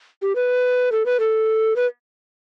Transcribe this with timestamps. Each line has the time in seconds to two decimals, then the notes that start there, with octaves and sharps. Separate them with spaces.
0.22 G4
0.35 B4
0.92 A4
1.06 B4
1.20 A4
1.76 B4